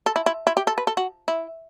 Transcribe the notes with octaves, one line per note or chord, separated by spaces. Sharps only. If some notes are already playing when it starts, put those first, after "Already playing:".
A4
E4
E4
E4
G4
A4
B4
A4
F#4
E4